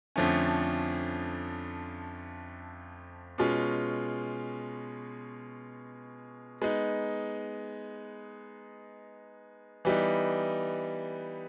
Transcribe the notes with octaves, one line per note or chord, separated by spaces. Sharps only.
F2 D3 F3 A3 C#4
B2 G#3 C#4 F4
G#3 B3 D#4
E3 G3 B3 D#4